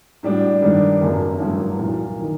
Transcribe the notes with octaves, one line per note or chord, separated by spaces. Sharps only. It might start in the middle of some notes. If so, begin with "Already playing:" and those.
A2 G3 D4 F#4
G2 D#3 G3 D4
F#1 F#2 F#3 A#3
A1 G2 F#3 A#3
C2 A#2 F#3
D#3